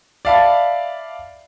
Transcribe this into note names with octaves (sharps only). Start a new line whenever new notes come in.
D5 E5 F5 A5 B5